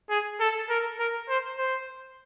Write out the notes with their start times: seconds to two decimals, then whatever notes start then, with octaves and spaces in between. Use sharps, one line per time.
0.10 G#4
0.40 A4
0.70 A#4
0.99 A#4
1.29 C5
1.58 C5